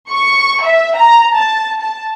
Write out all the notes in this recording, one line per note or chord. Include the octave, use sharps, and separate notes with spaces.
C#6
E5
A#5
A5
A5